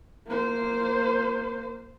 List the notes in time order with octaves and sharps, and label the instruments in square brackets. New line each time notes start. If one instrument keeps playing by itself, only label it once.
[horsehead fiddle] A#3 C5